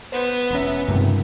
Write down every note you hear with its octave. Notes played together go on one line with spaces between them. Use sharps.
B3 B4 C5
E1 C#4 E5 A#5 B5
C#2 G2 C3 D#3 A#3